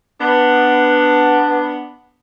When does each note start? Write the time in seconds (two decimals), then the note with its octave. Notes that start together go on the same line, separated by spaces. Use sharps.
0.21 B3 D4